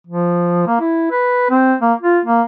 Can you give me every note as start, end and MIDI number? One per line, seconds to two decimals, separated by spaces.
0.07 0.66 53
0.67 0.76 58
0.80 1.06 64
1.11 1.48 71
1.50 1.75 60
1.81 1.93 58
2.01 2.20 65
2.25 2.42 58